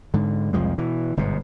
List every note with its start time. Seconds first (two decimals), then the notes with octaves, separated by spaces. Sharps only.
0.14 G#2 D3
0.53 C2 F2 F3 G#3
0.78 B2 E3
1.17 G1 G#2 B2